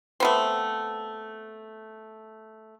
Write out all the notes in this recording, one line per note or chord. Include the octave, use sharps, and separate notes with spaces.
A3 B3 C4